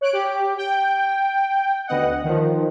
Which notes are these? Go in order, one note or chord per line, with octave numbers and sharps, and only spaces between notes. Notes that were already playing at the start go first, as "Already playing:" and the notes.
C#5 F#6 D7
G4
G5
D2 B3 D#5 F#5
D#3 F3